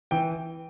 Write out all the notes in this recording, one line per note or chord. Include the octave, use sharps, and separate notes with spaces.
E3 G5